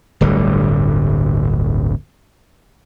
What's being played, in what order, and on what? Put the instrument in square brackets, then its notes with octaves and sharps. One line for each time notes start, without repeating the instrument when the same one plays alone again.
[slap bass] D1 G1 D3 G3